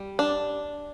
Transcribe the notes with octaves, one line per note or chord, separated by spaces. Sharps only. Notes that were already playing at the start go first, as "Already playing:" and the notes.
Already playing: G3
D4